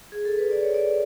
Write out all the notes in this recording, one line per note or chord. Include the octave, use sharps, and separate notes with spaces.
G#4
A4
B4
D5
C#5
D5